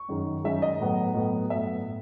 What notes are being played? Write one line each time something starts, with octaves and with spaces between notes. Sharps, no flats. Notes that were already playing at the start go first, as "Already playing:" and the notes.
Already playing: C#6
F#2 D#3 G#3 D#4
F#2 D#3 G#3 D#4 E5
D#5
A2 F#3 B3
A2 F#3 B3
A2 F#3 B3 E5
A2